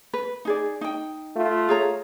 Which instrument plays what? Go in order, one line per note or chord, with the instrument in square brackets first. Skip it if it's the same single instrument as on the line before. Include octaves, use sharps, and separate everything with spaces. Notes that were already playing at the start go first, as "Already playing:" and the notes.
[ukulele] B4
D#4 G#4 D5
D#4 G5
[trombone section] A3 F4
[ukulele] G#4 C#5 A#5